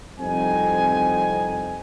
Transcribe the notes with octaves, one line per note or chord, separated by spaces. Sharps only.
C2 F2 C4 D#4 G#5